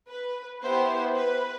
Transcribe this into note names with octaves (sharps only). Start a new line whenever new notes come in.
B4
B3 E4 G4 C5
B4